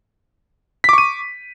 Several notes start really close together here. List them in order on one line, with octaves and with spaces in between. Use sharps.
B6 D6 C#6 D#7